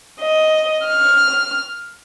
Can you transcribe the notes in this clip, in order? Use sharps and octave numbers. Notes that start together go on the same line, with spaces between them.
D#5
F6